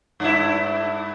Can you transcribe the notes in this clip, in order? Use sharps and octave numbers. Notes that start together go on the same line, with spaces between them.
G2 E4